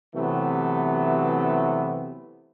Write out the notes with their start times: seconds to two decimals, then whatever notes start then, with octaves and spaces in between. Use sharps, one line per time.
0.16 C3 E3 F#3 A3 B3